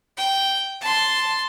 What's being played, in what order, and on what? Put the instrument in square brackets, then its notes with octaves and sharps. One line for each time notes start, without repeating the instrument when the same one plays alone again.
[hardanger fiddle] G5
A5 C6